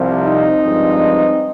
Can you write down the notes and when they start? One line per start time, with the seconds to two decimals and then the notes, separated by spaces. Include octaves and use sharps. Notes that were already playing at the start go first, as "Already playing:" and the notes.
Already playing: C2 C3 F3
0.22 C4 D#4
0.63 G2 F3 G#3